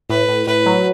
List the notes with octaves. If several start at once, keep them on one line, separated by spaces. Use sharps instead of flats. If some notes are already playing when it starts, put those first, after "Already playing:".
A2 B4
A2
A2 B4
F#3